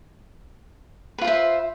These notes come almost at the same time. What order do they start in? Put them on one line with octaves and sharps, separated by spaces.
B4 F4 C5 E5